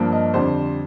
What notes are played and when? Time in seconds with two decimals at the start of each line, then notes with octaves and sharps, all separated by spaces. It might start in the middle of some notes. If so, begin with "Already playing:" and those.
Already playing: G2 F3 A#3
0.12 D#5
0.34 F2 D3 G3 C5